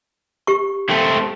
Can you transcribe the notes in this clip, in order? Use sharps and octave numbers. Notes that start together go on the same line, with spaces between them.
G4 C#6
A3 C4